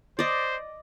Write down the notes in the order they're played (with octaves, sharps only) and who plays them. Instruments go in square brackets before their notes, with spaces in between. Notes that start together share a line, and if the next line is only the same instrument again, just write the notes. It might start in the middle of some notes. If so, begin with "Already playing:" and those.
[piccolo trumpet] C5 [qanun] D5 D#5